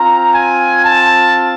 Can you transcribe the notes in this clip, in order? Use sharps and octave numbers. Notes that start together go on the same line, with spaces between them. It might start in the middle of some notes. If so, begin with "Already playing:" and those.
Already playing: C4 F4 A#5
G#5
A5